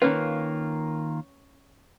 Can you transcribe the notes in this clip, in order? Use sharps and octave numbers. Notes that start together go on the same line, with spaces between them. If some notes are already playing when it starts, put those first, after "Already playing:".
D#3 A#3 C#4 F4 B4